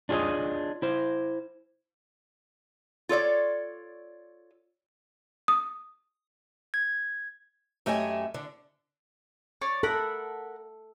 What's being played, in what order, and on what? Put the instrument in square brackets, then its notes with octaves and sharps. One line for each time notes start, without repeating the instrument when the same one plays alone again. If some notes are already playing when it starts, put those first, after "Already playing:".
[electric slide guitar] D4 F4 G#4 C#5 D#5
E4 C5
[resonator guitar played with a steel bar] F4 A4 C#5 D5
[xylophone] D#6
[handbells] G#6
[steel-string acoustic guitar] F#2 A3 G4 D#5 E5 G#5
D3 D4
[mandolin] C#5 D5
[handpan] A4 [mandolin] A#4 F#5 B5